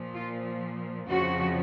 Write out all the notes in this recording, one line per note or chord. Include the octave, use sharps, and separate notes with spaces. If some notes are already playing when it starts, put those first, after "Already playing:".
Already playing: A#2 F3
F4
F2 C#3 F3 F#4